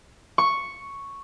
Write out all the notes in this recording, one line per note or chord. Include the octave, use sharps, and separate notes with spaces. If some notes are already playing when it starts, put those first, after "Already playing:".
C#6